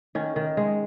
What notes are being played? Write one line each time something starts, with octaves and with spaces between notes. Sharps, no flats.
D#3 C#4
D#3
G#3